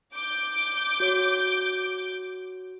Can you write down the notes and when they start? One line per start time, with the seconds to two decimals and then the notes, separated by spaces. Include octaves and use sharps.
0.13 D6 G6
1.00 F#4 C#5